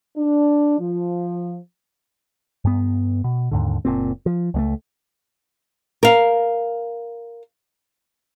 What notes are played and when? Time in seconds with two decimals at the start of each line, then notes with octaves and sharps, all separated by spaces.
0.17 D4
0.79 F3
2.65 G2 B3
3.24 B2
3.51 D#2 G#2 D3
3.85 F#1 A#2 C4
4.26 F3
4.54 C#2 G#3 A3
6.03 A#4 F5